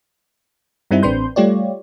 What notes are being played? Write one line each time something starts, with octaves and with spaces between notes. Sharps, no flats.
G2 G3 C4 D#4 E4
A1 C4 D4 B4 C6 G6
G3 A3 F4 G4 C#5 D5